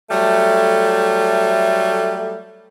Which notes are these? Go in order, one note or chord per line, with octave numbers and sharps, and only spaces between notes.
F#3 G3 A3